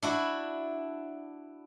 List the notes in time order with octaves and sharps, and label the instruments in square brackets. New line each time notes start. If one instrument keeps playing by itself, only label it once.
[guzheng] D4 E4 F#4